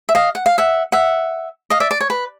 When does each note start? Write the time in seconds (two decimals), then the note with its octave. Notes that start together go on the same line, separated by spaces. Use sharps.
0.09 E5
0.15 D#5 F5
0.35 F#5
0.46 F5
0.58 E5 F#5
0.92 E5 F#5
1.70 D#5 F5
1.80 D5 E5
1.91 D5
2.00 C#5
2.10 B4